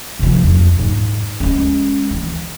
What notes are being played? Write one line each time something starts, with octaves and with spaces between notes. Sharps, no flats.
C3 F3
F2 F#3
G#2
G#3 C#4
D#3 E3